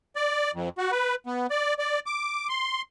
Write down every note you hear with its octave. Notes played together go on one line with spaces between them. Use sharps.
D5
F2
F#4
B4
B3
D5
D5
D6
C6